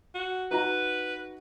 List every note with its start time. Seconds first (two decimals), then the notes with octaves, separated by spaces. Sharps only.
0.15 F#4
0.51 D#4 F#4 B4 A#5